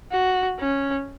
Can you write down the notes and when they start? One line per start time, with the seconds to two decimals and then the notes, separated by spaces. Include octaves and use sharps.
0.12 F#4
0.59 C#4